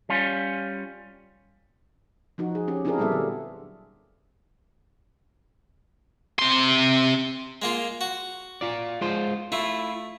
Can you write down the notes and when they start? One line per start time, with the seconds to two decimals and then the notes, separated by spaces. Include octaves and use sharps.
0.09 G3 C#4 F4
2.38 F3 D#4 F#4
2.55 G#4
2.68 C#4 G4
2.85 C4 D4 E4 F#4 G#4 A#4
2.98 A#2 G3 A#3 B3 A4 E5
3.12 D3 F#3
6.39 C3 C6
7.62 G#3 A#3 F4
8.01 F#4
8.61 F4 D5
9.01 G#3 F4 C5
9.52 A3 E4 F4